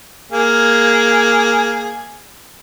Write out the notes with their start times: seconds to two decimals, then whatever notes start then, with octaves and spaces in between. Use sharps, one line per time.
0.32 A#3 G#4